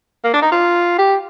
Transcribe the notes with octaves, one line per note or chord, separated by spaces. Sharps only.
A#3
D4
D#4
F4
G4